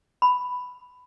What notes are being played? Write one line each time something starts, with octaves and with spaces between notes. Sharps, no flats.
B5